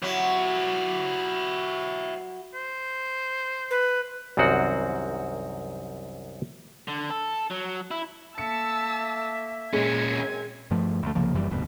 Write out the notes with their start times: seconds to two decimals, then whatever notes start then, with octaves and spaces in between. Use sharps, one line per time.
0.02 F#3 E4 G4
2.55 C5
3.71 B4
4.37 C2 F#2 D#3 C4 F#4 F#5
6.88 D3
7.10 A4
7.51 F#3
7.91 E4
8.38 A3 A#3 E5 A5 E6 C#7
9.73 A#2 G#3 C#4 G#6
10.10 F#2 C4 G#5
10.71 G2 F3 A3
11.03 D2 A3
11.15 C2 C#3 F3 A#3
11.33 F#1 F#2 E3 G3
11.51 F1 D2 G2 B2